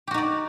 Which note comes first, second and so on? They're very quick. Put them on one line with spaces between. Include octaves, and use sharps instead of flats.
G4 F#4 D#4 D5